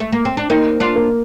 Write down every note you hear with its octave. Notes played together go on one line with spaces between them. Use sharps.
A3
A#3
C4
D4
A#3 C4 D#4
D4 F4
A#3